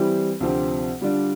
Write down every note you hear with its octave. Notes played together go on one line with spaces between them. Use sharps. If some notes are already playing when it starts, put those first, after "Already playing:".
Already playing: E3 G3 C4 E4 G4
D2 C3 F3 C4 G4
D3 G3 D4 F4